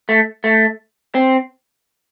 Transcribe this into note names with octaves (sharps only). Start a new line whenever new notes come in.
A3
A3
C4